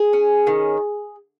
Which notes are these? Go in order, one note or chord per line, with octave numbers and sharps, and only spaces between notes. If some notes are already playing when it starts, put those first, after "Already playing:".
Already playing: G#4
C#4
D#3